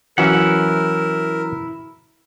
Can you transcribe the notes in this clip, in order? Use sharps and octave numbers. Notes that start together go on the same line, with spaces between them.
E3 F#3 C#4 E4 A#4 F#5